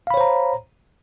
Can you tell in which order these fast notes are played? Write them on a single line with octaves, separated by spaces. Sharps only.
F5 B5 C#5 C5 A#5